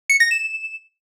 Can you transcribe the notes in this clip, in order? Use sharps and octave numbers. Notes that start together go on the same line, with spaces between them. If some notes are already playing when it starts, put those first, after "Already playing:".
C#7
A#6
E7